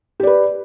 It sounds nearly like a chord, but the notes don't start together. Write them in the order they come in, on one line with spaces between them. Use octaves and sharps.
G4 D5 B4